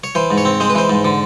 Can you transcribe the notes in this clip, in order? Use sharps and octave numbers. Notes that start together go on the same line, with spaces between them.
C#5
E3 C5
G#2
C#5
C4
G#3 C5
B4
E3 C5
G#2
D3